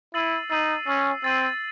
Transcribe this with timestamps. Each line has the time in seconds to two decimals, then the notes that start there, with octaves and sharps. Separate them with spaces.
0.14 E4 E6 A6 C7 D#7 F#7
0.50 D#4 E6 A6 C7 D#7 F#7
0.86 C#4 E6 A6 C7 D#7 F#7
1.23 C4 E6 A6 C7 D#7 F#7